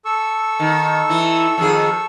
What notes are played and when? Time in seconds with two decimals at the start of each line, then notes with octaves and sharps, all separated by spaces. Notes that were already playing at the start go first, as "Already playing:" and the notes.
0.05 A4 C#6 E6
0.60 D#3
1.09 E3 E4
1.58 F2 D#3 G#4